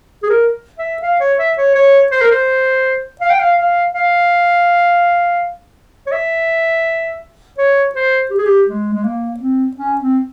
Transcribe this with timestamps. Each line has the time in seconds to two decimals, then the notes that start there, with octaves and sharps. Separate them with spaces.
0.23 G#4
0.30 A#4
0.79 E5
1.02 F5
1.21 C#5
1.39 E5
1.58 C#5
1.75 C#5
2.12 C5
2.21 A#4
2.31 C5
3.21 F5
3.30 G5
3.40 F5
3.58 F5
3.94 F5
6.07 C#5
6.12 E5
7.58 C#5
7.95 C5
8.30 G4
8.38 G#4
8.46 G4
8.68 G#3
8.94 G#3
9.04 A#3
9.40 C4
9.77 C#4
10.01 C4